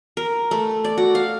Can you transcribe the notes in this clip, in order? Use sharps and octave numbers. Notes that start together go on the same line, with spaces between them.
A#4
A3
D5
F#4
F5